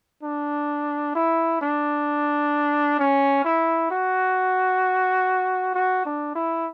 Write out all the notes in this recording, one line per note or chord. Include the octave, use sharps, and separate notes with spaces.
D4
E4
D4
C#4
E4
F#4
F#4
D4
E4